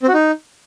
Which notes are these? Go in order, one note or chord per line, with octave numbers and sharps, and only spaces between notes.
C4
F#4
D#4